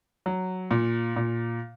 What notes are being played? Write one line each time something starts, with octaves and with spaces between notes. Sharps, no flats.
F#3
A#2
A#2